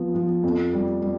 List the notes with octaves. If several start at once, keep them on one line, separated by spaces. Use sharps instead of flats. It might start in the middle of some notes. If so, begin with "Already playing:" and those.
Already playing: F3 B3
F3
F2
G3
G3